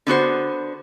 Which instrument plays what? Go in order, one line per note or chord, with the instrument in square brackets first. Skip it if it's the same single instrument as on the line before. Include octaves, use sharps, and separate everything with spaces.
[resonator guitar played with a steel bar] D3 B3 F#4 C5